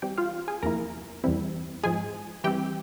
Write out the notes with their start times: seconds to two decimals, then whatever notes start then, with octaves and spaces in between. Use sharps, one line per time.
0.02 E3 G3 C4 G4 G5
0.18 F4 F5
0.48 G#4 G#5
0.63 E2 C3 F3 A#3 E4 A#4 A#5
1.24 E2 E3 G3 C4 E4
1.83 G#2 F3 G#3 G#4 G#5
2.44 E3 G3 C4 G4 G5